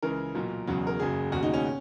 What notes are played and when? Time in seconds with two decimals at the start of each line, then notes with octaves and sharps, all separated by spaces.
0.02 C#2 C#3 E3 A#4
0.35 B1 A#2 F#3
0.67 E1 E2 C#3 F#3
0.87 A#4
1.00 F#1 F#2 C#3 F#3 G#4
1.32 E1 D#2 C#3 F#4
1.43 D#4
1.54 C#4